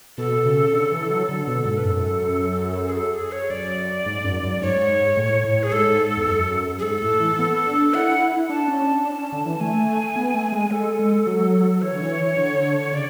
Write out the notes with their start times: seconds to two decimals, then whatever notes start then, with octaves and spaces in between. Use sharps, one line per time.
0.18 B2 A4
0.46 C#3
0.73 D3
0.92 E3
1.10 F#3
1.29 D3
1.47 B2
1.65 G#2
1.77 B4
1.84 F#2 A4
2.88 G#4
2.95 A4
3.14 G#4
3.32 C#5
3.50 F#2 D5
4.06 G#2
4.24 F#2
4.43 F#2
4.61 G#2 C#5
5.17 A2
5.45 A2
5.63 G#4
5.72 G#2 A4
6.17 E2
6.28 F#2
6.79 G#4
6.83 G#2 A4
7.01 A2
7.20 E3
7.39 B3
7.67 D4
7.94 E4 F#5
8.22 E4
8.49 D4 A5
8.68 C#4
8.87 D4
9.05 D4
9.18 C#4
9.32 D3
9.46 E3
9.60 A3 G#5
10.16 B3
10.34 A3
10.52 G#3
10.71 G#3 A4
10.99 G#3
11.27 F#3
11.82 E3 C#5
11.91 D3
12.01 E3
12.37 D3
12.93 C#3 D5